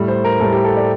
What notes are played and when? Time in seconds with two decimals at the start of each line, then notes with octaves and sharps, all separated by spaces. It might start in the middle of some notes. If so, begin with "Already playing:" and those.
Already playing: A2 G3
0.08 C5
0.24 A#4
0.40 A2 G3 A4
0.53 G4
0.65 A4
0.76 D5